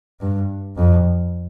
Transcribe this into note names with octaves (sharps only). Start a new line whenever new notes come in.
G2
F2